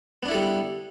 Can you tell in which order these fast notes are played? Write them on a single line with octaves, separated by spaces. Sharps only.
B3 D4 E4 A4 G3